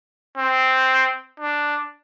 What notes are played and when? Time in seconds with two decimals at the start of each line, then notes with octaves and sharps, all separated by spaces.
0.37 C4
1.40 D4